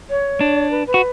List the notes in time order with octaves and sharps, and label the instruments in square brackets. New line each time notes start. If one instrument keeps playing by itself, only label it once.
[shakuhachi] C#5
[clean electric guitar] D4
[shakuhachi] B4
B4
[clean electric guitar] F#4